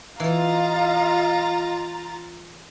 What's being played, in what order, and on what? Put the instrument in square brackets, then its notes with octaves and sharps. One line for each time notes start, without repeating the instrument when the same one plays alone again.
[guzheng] E3 [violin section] F4 A#5 A6 [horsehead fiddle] D#5 F5